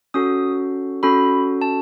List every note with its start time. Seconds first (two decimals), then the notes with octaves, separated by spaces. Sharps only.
0.14 C#4 F#4 A4 D#6
1.03 C#4 F#4 A4 B5
1.61 A5